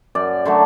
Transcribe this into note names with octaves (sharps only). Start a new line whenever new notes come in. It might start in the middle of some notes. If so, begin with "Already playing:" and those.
F#2 D5
D3 F#3 A3